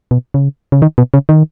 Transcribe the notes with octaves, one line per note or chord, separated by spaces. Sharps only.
B2
C#3
C#3
D#3
B2
C#3
D#3